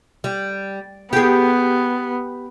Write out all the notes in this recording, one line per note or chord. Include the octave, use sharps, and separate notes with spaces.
G3
B3 G4 G#4